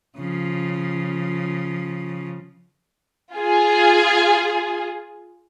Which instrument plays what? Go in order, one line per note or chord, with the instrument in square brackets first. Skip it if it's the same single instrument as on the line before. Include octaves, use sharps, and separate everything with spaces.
[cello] C#3 F3
[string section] F4 G#4